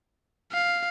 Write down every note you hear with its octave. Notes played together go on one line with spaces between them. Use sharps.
F5